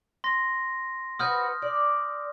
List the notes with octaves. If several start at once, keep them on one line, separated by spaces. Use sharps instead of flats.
C6 A#6
F#4 B4 C5 D#6 F6 G6
D5